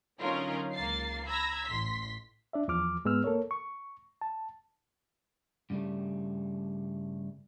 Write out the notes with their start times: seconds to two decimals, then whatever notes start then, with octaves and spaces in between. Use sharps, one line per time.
0.21 D3 F#3 C#4 D#4 F4 A#4
0.73 C#2 A#3 A6 C7
1.25 A#5 B5 E6 G#6 A#6
1.65 A1 C6 B6
2.53 D4 D5 E5
2.68 E2 F3 D6 F6
3.05 G#2 G#3 B3 E6 F6
3.24 A#3 A4 A#4 C#5
3.51 C#6
4.21 A5
5.70 G2 C#3 F#3 G3 A3